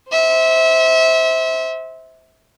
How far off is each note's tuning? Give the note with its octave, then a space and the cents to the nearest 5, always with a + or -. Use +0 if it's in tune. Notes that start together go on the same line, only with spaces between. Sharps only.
C5 +0 E5 -25